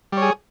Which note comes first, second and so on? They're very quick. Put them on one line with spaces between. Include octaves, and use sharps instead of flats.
G3 C#5 G#4